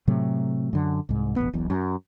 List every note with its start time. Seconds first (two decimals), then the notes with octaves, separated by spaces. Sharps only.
0.07 A2 C3 F#3 A3
0.73 F#2 D3
1.09 C2 G#2
1.36 E1 A1 B3
1.53 E1 B1 E2
1.70 F#2